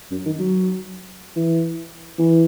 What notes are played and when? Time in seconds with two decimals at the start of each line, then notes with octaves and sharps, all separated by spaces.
0.11 F#2
0.26 D#3
0.39 F#3
1.36 E3
2.19 E3